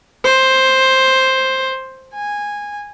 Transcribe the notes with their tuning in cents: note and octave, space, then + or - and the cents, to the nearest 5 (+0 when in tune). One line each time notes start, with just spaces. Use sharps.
C5 +10
G#5 -10